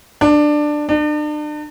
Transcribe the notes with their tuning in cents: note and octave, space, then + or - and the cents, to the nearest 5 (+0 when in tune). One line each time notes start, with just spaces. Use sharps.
D4 +15
D4 +40